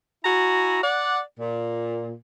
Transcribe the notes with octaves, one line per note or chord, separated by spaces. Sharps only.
E4 F#4 G#5 A#5
D5 F#5
A#2